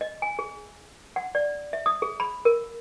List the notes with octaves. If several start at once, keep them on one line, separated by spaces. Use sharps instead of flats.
D#5
G#5
G#4
F#5
D5
E5
D#6
G#4
B5
A#4